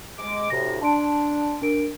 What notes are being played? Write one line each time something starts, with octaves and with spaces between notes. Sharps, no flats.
G#3 D6
D2 A2 C3 A#6
D4 A5 C6 D7
D4 A#4 D7